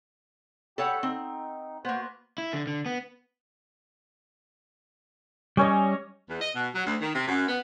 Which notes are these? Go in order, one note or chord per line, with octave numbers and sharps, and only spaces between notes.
G4 A4 C#5 F#5 G5 B5
C4 D#4
A#3 B3 F#4 C5
E4
D3
D3
B3
G3 C#4 C#5 D#5
E2
D#5
B2
F#3
D2
D#3
C3
F#2
B3